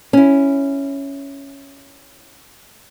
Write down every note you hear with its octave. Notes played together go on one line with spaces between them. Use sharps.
C#4 E4